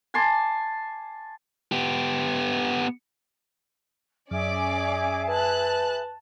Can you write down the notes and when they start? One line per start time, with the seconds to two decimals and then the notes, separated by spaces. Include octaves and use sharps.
0.14 G#5 A5 C6 D6
1.72 B3 G4
4.31 F#2 C#4 G#4 D5 E5 G#5 D6
5.29 B4 A5 F#6